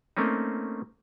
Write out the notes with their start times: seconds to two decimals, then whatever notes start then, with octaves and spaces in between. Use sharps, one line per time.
0.17 A3 A#3 C4 C#4 D#4